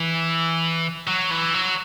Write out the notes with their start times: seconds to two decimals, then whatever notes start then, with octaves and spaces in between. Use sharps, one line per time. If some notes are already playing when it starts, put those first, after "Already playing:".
Already playing: E3
1.07 F#3
1.31 E3
1.54 F#3